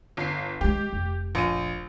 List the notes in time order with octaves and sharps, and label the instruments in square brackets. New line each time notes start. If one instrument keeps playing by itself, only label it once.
[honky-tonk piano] G1 C7
[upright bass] G#3 A3 [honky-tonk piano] G4
[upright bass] F1
[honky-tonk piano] A#1 D#7